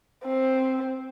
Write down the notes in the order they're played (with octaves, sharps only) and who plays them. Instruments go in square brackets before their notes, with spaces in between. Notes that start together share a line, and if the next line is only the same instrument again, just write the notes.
[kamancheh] C4